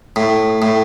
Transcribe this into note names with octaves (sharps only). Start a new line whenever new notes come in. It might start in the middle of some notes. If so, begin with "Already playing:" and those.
A2
A2